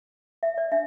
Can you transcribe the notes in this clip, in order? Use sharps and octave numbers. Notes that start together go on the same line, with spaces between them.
E5
D5
D4 E5